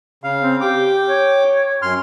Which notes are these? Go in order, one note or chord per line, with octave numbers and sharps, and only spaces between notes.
C#3 F5
C4
G4 G5 D6
C#5
F#2 C6 F6